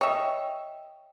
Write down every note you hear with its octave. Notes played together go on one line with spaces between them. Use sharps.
C#5 D#5 E5 G5